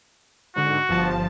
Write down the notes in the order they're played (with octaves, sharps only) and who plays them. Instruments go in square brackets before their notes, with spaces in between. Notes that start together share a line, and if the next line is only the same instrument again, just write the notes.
[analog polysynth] G#2 D3 [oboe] F#4
[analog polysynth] G1 F3 A5